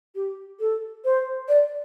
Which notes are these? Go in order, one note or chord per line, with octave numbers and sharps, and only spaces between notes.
G4
A4
C5
D5